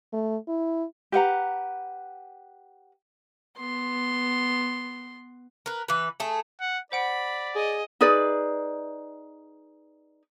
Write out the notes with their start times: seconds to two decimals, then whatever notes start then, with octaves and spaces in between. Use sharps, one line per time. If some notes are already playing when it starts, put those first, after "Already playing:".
0.13 A3
0.48 E4
1.12 G4 B4 F#5 A#5
3.57 B3 C6
5.66 A#4 B4
5.88 E3 B4
6.20 A3 G#4
6.61 F#5
6.92 C5 D5 F#5 B5 D7
7.55 G#4 D#5
8.01 D#4 G#4 B4 D5